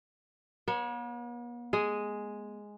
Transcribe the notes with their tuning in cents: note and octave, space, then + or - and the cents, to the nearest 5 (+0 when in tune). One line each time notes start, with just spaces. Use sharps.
B3 -45 C#5 +0
G#3 +0 G#4 +0